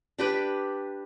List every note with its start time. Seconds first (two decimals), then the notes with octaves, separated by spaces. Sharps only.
0.18 D4 G4 B4